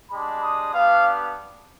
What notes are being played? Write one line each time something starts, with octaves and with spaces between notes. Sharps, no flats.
G#3 D4 G4 B5
D#6
B3 D4 G4 F5